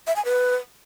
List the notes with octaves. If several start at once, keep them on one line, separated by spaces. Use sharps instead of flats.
E5
G#5
B4